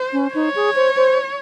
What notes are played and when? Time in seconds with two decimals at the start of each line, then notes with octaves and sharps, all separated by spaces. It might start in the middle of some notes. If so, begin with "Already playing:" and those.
Already playing: C5
0.13 C#4
0.35 D#4 C#5
0.56 G#4
0.76 C5
0.96 C5